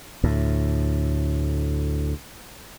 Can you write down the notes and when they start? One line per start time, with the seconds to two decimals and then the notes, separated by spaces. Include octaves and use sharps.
0.24 D2 A2